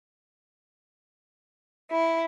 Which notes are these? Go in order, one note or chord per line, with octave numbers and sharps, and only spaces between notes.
E4